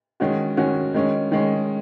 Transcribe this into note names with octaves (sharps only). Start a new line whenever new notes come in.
D#3 G#3 C#4 F#4
D#3 G#3 C#4 F#4
D#3 G#3 C#4
D#3 G#3 C#4